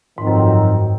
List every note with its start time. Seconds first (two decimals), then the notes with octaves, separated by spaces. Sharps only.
0.18 F2 G#2 D#3 F#3 C4
0.27 F#2
0.36 G#2